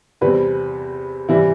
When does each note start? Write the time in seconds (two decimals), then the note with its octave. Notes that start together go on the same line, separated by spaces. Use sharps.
0.21 E2 C3 G3 C4 B4
1.28 C3 E3 G3 E4